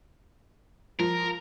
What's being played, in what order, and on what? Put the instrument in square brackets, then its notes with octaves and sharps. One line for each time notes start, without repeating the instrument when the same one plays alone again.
[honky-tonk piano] F3 [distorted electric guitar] A#4